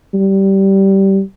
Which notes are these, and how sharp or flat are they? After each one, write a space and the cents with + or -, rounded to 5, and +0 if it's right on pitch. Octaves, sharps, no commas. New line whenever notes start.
G3 -15